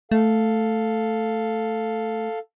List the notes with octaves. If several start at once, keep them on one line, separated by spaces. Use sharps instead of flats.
A3 A4 F5